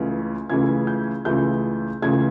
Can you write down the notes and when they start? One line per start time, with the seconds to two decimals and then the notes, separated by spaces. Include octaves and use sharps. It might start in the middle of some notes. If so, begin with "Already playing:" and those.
Already playing: C#2 C#3 E3 A3
0.49 C#2 C#3 E3 A3 G#6
0.87 G6
1.25 C#2 C#3 E3 A3 G6
2.02 C#2 C#3 E3 A3 G#6